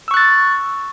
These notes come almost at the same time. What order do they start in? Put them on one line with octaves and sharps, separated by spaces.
E6 C#6 F#6 A6